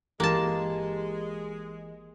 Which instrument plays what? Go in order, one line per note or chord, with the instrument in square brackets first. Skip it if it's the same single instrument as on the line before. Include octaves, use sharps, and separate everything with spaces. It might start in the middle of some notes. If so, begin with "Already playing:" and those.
[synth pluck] G1 G4 C6 [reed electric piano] E3 [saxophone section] G#3 [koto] A#3 A5